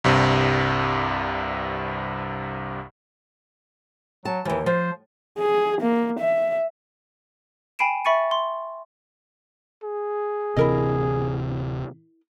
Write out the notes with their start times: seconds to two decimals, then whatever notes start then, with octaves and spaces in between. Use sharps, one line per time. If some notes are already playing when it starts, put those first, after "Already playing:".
0.04 C2 G2 C3
4.25 F#3 A5
4.45 D#2 E3 F3
4.66 F3 C5
5.38 G#4
5.81 A#3
6.19 E5
7.79 G5 G#5 B5 C7 D7 E7
8.05 E5 B5 C#6 A6 C#7 D#7
8.31 C6
9.83 G#4
10.57 D1 C3 E3 E4 A#4 D#5